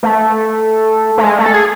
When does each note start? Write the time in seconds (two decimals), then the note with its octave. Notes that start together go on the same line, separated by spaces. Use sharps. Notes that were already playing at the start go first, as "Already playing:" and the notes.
0.03 A3
1.18 A3
1.24 G#3
1.39 A3
1.46 A4
1.54 G#4